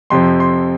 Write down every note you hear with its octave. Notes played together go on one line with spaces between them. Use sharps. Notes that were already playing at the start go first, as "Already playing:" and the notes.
F2 C3 F3 C6
C6